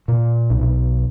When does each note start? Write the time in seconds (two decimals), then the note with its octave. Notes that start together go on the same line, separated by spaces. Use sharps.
0.08 A#2
0.50 B1